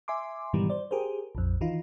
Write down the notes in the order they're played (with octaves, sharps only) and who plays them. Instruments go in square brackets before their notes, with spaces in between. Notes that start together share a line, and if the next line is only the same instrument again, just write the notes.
[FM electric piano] E5 G#5 C6 D6
G#2 B2 D#3 E3 G3
C5 D5
G4 G#4 A#4 C5
A#1 F2
D#3 E3 D#4 F4